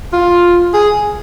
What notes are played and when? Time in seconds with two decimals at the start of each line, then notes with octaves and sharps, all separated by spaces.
0.13 F4
0.74 G#4